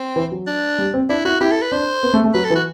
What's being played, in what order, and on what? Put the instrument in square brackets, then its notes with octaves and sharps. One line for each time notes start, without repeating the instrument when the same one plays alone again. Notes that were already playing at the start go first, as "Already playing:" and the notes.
Already playing: [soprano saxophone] C4
[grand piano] E3
F#3
[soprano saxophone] D4
[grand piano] G3
C4
[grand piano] D4 [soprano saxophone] E4
[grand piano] E4 [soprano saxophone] F#4
[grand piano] E4 [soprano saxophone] G4
[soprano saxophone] A4
B4
[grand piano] D4 [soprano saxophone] C5
[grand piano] B3
A3
A3
[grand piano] F#3 [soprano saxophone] B4
[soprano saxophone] A4
[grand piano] E3
[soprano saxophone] F#4